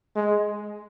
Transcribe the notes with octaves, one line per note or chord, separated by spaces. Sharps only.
G#3